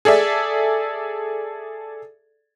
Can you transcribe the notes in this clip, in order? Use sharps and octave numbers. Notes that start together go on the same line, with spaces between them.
G#4 A4 D5 E5